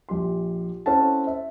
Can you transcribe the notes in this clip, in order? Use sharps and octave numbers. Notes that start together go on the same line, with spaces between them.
A#1 G4 C6
C4 C#4 E4 A4 F#5 A5
E5